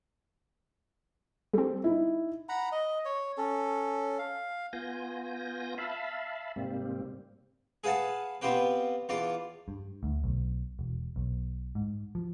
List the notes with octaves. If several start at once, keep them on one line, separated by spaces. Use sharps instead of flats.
G3 C4 A4
D#4 E4
F#5 A#5 B5
D#5
C#5
C#4 A4
F5
B3 F4 G#5 G6 A#6
E5 F5 A5 B5
G#2 C3 G3 A#3 C4
G#4 B4 F5 F#5 A5
B3 C4 F4 G4 B4
E2 F4 D5
G2
D2
B1
E1
B1
G#2
F3